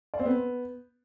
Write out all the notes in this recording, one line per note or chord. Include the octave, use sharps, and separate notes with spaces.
D5
C4
B3